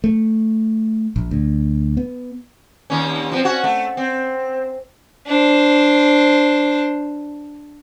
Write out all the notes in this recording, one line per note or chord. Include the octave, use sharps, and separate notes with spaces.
A3
A#1
D2
B3
D#2 C#4
F3 B3 C4
C#4 F#4
A3
C4
D4 C5